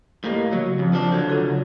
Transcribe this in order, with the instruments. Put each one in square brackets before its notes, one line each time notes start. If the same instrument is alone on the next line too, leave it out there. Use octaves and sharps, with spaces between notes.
[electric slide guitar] A2 A#3 [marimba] G4 D#5
[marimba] C#3 [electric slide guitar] F#3
[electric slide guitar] F2
F3 D4
[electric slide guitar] D3 F#3 [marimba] G6
[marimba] C#3 F4 A4